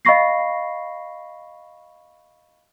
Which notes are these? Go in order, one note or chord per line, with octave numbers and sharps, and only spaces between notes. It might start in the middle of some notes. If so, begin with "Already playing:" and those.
D#5 F5 B5 C#6 A#6 C7